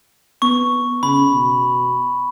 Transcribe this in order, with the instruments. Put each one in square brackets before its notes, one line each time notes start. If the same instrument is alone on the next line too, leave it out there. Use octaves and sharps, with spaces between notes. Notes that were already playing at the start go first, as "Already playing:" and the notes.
[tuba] B3 [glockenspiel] C#6
[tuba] C#3 [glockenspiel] B5
[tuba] B2